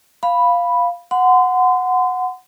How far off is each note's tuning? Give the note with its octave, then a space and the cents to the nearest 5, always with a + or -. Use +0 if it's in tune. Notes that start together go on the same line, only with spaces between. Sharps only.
F5 +0 B5 +0
F#5 -10 C6 -35